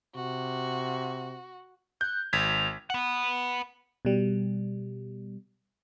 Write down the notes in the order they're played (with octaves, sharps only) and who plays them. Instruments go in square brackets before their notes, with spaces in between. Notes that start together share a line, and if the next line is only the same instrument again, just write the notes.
[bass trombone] C3 [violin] F#4
[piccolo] F#6 [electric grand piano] G6
[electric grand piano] G#1 G#6 B6 [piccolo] F7
[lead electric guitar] B4 F#5
[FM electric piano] B2 G3